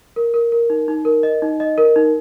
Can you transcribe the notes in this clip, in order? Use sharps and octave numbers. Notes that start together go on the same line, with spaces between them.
A#4
A#4
A#4
D#4
D#4
A#4
D#5
D#4
D#5
A#4
D#4